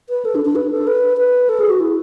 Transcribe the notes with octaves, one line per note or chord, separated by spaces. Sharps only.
B4
A4
D4
D4
B4
A4
B4
B4
A4
G#4
F#4
E4